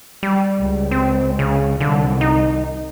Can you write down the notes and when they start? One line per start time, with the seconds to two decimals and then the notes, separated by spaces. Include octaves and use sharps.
0.23 G3
0.58 C#2
0.91 C4
1.39 C#3
1.81 C2 D3 D#3
2.21 D#4